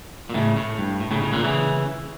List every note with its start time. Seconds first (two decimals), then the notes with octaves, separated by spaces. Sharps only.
0.30 A#2
0.34 A2 C#3
0.57 A2
0.78 G2
1.00 A2
1.11 A2 C#3
1.22 A2 C#3
1.33 A#2 D3
1.44 C#3 E3